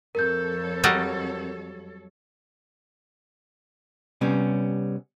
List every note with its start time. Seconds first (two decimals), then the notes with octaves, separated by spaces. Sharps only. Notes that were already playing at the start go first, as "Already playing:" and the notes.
0.15 F2 A4 A#4 C#5 G6
0.84 F#3 G3 D#5
4.21 C3 G3 B3 C#4